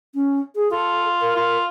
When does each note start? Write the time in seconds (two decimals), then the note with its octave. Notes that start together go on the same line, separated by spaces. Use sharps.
0.14 C#4
0.55 G#4
0.71 F4 A4
1.21 A#4
1.36 F4